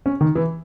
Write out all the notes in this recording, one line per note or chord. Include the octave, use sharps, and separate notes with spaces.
C#4
D#3
E3